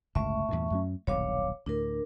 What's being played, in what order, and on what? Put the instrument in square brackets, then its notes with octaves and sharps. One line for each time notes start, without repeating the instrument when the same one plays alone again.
[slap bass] G1 C#2 A2 [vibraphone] A3 E5 C#6
[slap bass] E2 G2 A#2
F#2 F#3 C#4
[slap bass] D#1 B1 G2 [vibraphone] C#5 F5 D6
[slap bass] D2 A2 [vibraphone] D4 A#4